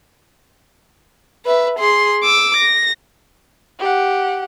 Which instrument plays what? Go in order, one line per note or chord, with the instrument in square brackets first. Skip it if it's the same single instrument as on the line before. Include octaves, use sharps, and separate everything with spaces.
[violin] B4 E5
G#4 C6
D6 E6
A#6
[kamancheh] G4 F#5